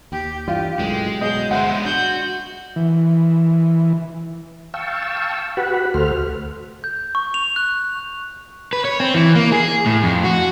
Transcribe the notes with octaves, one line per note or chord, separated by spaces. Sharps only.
D#2 G4
G2 E3 G3 F4 G4
B1 F#2 A2 G#3
B2 F#3 G#4 D#5 G6
G1 G#3 B3 C5 E5 F#5
D4 F#4 G6
E3
F5 G5 A5 C#6 E6
F#4 G4 B4 F#5 B5
D2 A3 F#4 A4 C5 F6
G6
C#6
F7
F#6
B4
C#5
C4
E3
A#3
G#4
A2
F2
F#4